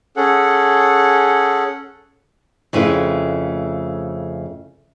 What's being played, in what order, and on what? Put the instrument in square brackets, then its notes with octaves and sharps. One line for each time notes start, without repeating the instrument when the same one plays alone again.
[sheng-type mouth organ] C#4 G#4 A4 F#5
[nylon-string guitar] F2 C#3 A3 E4 B4